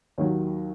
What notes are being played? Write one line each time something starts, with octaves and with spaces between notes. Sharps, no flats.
D#2 D#3 F#3 C#5